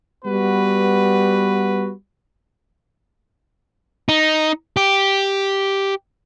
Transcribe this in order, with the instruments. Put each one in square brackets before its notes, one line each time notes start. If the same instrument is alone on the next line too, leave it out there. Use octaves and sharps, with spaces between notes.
[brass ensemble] G3 B3 F#4 B4
[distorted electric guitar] D#4
G4